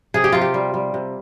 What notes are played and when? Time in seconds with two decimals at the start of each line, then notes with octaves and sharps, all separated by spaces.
0.14 C3 G#4
0.24 G4
0.32 C3 F4
0.41 G4
0.54 G3
0.74 G3
0.94 C3